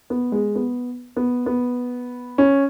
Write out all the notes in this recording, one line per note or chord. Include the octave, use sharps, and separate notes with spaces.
B3
G#3
B3
B3
B3
C#4